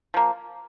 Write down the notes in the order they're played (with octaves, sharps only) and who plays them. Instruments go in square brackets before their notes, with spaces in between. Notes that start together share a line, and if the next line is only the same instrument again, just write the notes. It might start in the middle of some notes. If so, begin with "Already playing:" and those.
[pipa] F3 A#3